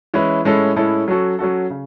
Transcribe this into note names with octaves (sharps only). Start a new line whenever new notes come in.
E3 G#3 C#4 E4 B4
A2 G#3 C#4 E4 A4
A2 G#3 C#4 E4 A4
F#3 C#4 F#4 A4
F#3 C#4 F#4 A4
C#3